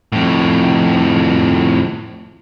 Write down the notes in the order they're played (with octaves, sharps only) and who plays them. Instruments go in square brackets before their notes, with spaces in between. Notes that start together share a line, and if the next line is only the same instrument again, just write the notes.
[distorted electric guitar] F2 A2